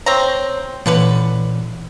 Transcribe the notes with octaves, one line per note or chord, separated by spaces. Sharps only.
C4 C#5 A#5
A#2 D3 E3 C#4 B4